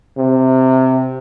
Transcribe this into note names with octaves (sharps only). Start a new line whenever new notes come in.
C3